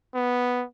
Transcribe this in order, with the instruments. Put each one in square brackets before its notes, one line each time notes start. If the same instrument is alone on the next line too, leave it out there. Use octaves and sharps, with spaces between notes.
[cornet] B3